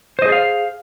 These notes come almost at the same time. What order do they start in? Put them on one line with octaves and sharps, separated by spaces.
C5 D#5 G#4 D5 F5